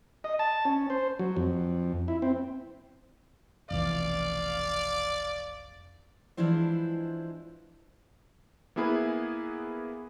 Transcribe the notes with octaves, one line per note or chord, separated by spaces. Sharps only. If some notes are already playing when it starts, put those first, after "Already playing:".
D#5
A5
C#4
C5
F#3
F2
E4
C4
F1 B1 E3 D5 F5
E3 F3 G#3 D4 E4 C5
A#3 B3 E4 G#4 B4